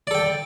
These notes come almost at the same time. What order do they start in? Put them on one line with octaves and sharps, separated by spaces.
D5 A4 G5